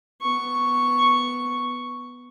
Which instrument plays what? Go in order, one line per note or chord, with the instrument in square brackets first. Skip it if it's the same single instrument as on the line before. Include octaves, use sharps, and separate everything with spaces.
[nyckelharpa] B3 C#6